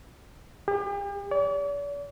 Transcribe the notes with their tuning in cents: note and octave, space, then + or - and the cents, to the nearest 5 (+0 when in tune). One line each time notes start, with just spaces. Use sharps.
G4 +40
D5 -45